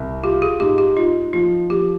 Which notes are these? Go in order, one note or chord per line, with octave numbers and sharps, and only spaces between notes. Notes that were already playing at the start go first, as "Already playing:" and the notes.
Already playing: C2
F4 G4
G#4
G#2 G4
G4
D#4 F4
F3 F4
F3 G4